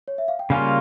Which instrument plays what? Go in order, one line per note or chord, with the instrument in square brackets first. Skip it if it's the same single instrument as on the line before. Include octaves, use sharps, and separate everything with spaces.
[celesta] C#5
E5
F5
G5
[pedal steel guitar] C#3 G3 A#3 C#4 F4 [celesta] F5 G#5